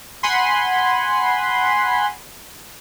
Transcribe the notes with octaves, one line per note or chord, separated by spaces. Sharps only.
F#5 G#5 B5 C6